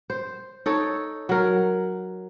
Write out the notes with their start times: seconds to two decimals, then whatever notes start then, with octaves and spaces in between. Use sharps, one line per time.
0.10 C5
0.66 D#4 A4 C#5
1.29 F#3 A#4